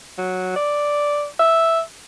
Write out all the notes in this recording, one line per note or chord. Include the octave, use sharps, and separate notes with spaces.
F#3
D5
E5